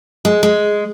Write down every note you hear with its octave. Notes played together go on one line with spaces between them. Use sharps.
G#3
G#3